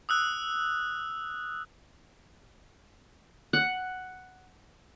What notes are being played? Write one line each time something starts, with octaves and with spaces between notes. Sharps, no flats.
D#6 E6 F#6
F#5